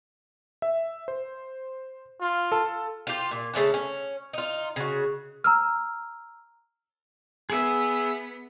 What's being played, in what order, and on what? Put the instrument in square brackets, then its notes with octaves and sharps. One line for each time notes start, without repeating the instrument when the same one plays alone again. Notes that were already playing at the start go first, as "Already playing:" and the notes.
[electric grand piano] E5
C5
[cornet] F4
[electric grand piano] A4 A5
[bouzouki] F4 G4
A#2
C#3 A3 C#4 D4
C#4
D#4 F4
C#3 F#4
[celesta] A#5 E6 F6
[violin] B3 B6 [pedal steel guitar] G#4 E5